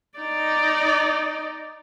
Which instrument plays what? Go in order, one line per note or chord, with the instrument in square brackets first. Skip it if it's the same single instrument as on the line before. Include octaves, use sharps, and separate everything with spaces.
[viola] D#4 D5